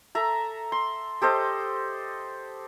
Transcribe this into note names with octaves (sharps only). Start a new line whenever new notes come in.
A4 E5 A#5
C6
G4 A4 C5 D#5